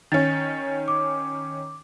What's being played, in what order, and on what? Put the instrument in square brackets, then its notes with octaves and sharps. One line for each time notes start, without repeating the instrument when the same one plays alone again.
[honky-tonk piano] D#3 C#4 [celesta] A6
[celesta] D6